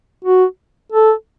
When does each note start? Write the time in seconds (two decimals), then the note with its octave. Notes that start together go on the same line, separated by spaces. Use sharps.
0.25 F#4
0.92 A4